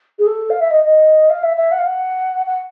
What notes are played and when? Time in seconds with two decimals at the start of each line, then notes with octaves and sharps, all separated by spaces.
0.19 G#4
0.27 A4
0.50 F5
0.60 E5
0.71 D#5
0.84 D#5
1.30 F5
1.43 E5
1.56 E5
1.72 F#5
1.79 F5
1.86 F#5
2.46 F#5